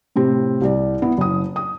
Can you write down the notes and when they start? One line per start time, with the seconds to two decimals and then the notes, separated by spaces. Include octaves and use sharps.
0.16 A2 C3 C4
0.61 C2 D5
1.02 B3 E4
1.18 F#1 D#6
1.56 D#6